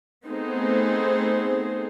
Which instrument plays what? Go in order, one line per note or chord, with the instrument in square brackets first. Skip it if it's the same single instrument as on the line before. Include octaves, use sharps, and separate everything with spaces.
[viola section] A3 B3 C4 D#4 G#4 C5